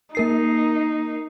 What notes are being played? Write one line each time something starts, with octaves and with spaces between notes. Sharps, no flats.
A#3 D#4 A#4 C7